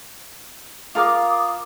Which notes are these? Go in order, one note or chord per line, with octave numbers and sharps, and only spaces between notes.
F4 A#4 F5 D6 D#6